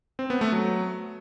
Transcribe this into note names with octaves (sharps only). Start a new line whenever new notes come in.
C4
B3
A3
F#3